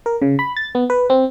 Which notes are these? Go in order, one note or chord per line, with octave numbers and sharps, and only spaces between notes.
A#4
C#3
B5
A6
B3
B4
C4